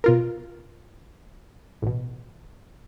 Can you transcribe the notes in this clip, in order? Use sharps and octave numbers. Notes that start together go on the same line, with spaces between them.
B2 F4 A#4
A1 B2